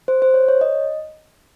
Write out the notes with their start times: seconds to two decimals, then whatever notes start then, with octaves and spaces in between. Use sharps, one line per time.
0.08 C5
0.22 C5
0.34 C#5
0.48 C#5
0.61 D#5